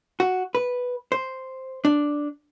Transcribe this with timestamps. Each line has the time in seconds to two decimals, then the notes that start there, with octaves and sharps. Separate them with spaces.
0.20 F#4
0.55 B4
1.12 C5
1.85 D4